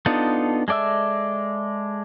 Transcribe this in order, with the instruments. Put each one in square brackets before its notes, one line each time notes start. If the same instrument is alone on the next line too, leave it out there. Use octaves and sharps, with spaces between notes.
[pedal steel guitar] B3 D4 D#4 F4 A4
G#3 A4 D5 E5 E6